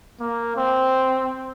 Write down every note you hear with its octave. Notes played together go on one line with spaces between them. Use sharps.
A#3
C4